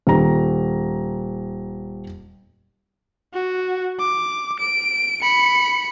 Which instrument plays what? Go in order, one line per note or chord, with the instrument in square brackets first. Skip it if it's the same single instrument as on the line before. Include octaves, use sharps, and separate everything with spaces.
[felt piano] D#1 A#5
[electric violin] F#4
D6
D7
B5 C#7